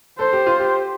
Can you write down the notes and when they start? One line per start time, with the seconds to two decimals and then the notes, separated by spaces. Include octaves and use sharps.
0.19 A4 C5
0.33 G4
0.47 F4
0.60 G4